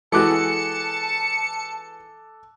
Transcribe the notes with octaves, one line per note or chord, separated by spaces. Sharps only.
E3 G#3 F#4 A4 A5 D6 F#6 C#7